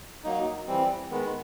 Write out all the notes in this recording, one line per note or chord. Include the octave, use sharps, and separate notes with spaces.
F#3 A#3 D#4
E3 G3 C4
D#3 G#3 B3